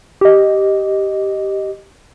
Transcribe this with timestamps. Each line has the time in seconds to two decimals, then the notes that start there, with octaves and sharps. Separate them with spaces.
0.21 G4 D#5